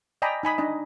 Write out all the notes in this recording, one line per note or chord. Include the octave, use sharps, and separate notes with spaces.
D5 D#5 G5 G#5 A#5 B5
D#4 G#5 B5 D#6
D4 D#4 D#5